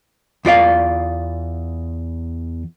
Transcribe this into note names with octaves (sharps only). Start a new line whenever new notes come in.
E2 F4 D5 F5